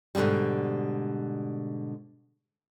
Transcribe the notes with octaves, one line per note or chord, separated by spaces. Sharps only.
G#2 B2 D3 D#3 G3